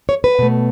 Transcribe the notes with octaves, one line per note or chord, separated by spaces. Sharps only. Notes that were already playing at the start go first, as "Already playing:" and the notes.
C#5
B4
B2 A3